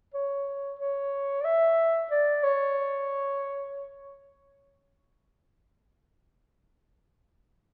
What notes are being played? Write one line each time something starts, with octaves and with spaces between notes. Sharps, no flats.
C#5
C#5
D5
E5
D5
C#5